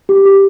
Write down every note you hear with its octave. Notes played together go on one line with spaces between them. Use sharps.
G4
G4